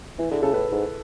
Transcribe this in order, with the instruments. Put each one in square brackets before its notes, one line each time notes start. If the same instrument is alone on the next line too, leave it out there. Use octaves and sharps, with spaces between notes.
[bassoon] E3 [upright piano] E4
[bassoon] D3 [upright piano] G#4
[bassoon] C#3 [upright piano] A4
[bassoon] A2 [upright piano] B4
[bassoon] G#2